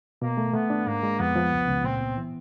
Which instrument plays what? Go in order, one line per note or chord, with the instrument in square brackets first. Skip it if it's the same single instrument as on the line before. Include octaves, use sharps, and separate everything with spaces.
[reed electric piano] B2 [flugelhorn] A#3
[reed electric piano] A3
[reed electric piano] A3 [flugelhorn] B3
[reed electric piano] D4
[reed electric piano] G#2 [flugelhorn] A#3
[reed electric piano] G#3
[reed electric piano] F2 [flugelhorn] B3
[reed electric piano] F3
C#2
C#2
[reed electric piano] A#2 [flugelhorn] C4
[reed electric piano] B3
E3